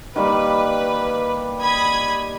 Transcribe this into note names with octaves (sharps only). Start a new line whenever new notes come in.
D#3 G3 A#3 B4
B5 D#6 G#6